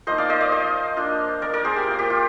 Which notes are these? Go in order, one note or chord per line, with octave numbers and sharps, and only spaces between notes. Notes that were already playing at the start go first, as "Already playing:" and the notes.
F3 A#3 D#4 C5 D#5
D5 F5
C5 D#5
D5 F5
C5 D#5
A#3 D4 F4
A#4 D5
A#4 D5
G#4 C5
G4
A#3 F4
G4
F4